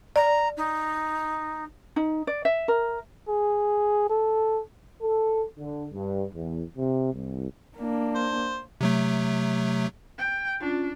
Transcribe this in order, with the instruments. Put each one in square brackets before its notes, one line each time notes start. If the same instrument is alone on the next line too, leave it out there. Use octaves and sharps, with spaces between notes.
[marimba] D5 [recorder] A#5
[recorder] D#4
[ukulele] D#4
D5
E5
A#4
[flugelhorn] G#4
A4
[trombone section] A4
D3
G2
E2
C3
C2
[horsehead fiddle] A#3 D4
[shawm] C5
[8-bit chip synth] C3 F#3 A3
[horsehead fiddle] G5
[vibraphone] C#4 F4 [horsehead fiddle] D4